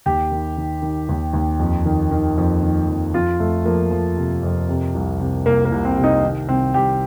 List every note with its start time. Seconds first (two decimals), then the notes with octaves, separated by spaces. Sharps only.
0.06 D#2 G4
0.31 D#3
0.57 D#3
0.82 D#3
1.09 D#2
1.33 D#2
1.60 F2
1.86 D#3
2.11 D#3
2.38 F2
2.63 D#3
2.88 F2
3.14 F2 F4
3.40 F2 A3
3.65 F3 A#3
3.91 F3
4.17 C3
4.43 F2
4.69 C3
4.95 C2
5.19 C3
5.46 C2 A#3
5.65 A#3
5.72 C2
5.85 C4
5.97 C3
6.04 D#4
6.23 D#3
6.48 C2 C4
6.74 C2 G4